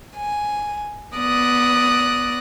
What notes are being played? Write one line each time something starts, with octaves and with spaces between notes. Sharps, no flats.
G#5
B3 D5 D#6 F#6 A#6